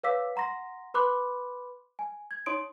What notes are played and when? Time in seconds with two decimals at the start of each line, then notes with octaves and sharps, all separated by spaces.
0.04 B4 C#5 F5 D6 E6 B6
0.36 F#5 A#5 C6 A#6
0.94 B4 B5 C6 D6 F#6
1.99 G#5
2.31 G#6
2.46 D#4 C#5 C6 D#6 D7